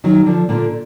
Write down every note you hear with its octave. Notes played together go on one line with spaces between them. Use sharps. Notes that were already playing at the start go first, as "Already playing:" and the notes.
D#3 F#3
D3 F3
A#2 D3